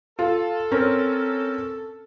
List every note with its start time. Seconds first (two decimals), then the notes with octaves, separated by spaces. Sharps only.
0.19 F4 A4
0.71 C4 C#4 A#4